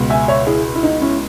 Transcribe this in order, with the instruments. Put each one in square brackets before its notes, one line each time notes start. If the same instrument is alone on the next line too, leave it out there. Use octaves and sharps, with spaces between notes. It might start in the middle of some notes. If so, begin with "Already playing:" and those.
Already playing: [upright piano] C#2 B2
E5 G#5
C#5 E5
E4 G#4
E4
D#4
C#4 E4